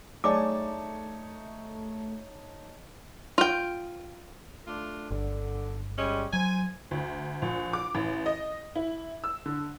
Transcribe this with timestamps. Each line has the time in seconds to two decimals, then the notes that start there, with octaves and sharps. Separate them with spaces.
0.24 A3 D#4 G#4 C#5 D5 G#5 A5 D6
3.38 F4 G5
4.66 A3 D4 F4
5.11 G1 D3
5.98 G3 G#3 C#4
6.33 F#3 C5 G#5
6.91 D2
7.42 A#1
7.73 D6
7.95 A1
8.26 D#5
8.76 E4
9.24 E6
9.46 D3